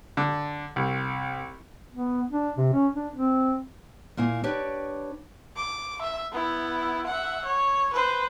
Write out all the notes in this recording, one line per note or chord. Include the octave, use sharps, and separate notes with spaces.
D3
C2
B3
D4
C3
C#4
D4
C4
A#2 A#3 E4 G#5
D4 G4 B4 C#5
D6
E5
B3 E4
E5 F#5
C#5
B4 C5